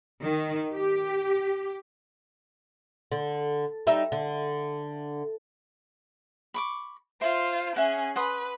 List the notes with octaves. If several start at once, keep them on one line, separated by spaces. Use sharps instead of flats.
D#3
G4
D3
G3 D#4 E5
D3
B5 C#6 D6
F4 C5 E5 C6
C#4 G#4 E5 F#5
B4 F#5 C6 D#6